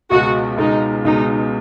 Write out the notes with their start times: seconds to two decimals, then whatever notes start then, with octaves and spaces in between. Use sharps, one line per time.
0.10 C#2 B2 G#3 F#4
0.58 C#2 B2 G#3 D#4
1.05 C#2 B2 G#3 D#4